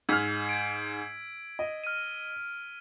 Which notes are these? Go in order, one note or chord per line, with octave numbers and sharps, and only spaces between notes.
G#2 E6 F6 G#6 B6
G#6 D7
D#5
F6 D#7